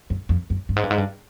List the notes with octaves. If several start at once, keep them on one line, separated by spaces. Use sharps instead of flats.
F#2
F2
F#2
G2
G#2
G2
G#2
G2